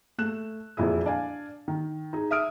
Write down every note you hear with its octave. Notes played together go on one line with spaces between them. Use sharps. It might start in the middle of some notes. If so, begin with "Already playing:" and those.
A3 F#6 E7
E1 F2 A#2 E4 G#4
D4 D5 F5 G#5
D#3
D#4 G#4
E5 D#6 F6 D7